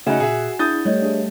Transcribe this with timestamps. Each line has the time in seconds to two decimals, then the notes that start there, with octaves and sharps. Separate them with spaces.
0.06 C#3 A3 D#4 F#4 E5 F#5 G#5 E7
0.20 A#2 G#4 E5
0.59 D4 E4 G#4 D#6 G6 A6
0.85 G3 A3 C#5 D#5
1.02 D4 G#4